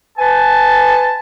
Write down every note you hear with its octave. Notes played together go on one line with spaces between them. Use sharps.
B4 G#5 A5